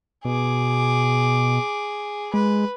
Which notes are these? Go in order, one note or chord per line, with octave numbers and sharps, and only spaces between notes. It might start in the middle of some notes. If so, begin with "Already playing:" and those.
B2 G#4 D6
G#3 B4